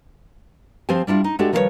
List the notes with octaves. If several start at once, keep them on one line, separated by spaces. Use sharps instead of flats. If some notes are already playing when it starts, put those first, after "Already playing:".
F3 C4 G4 C5 G#5
G3 D4 E4 F4
D#4
G#3 A3 D4 F#4 G4 A4
D#3 F3 G3 E4 B4 C#5